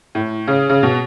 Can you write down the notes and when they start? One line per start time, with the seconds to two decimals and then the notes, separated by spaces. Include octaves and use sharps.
0.15 A2
0.48 C#3
0.70 C#3
0.83 B2